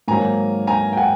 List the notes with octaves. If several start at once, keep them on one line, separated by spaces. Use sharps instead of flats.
G#2 D#3 F#3 A#3 G#5 A#5
G#5 A#5
G5
F#5 G#5